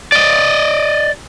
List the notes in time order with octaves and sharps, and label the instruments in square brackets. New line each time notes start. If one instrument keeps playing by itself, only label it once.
[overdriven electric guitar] D5 D#5